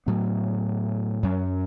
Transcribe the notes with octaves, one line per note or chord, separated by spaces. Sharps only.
A2 F#3 B3
F#2 F#3 C#4